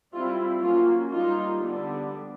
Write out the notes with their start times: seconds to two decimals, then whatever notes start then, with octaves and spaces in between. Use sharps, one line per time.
0.13 G3 C4 E4 F4
0.63 F#3 A#3 C#4 F4
1.12 G3 A#3 D#4 F4
1.62 D3 G3 B3 D4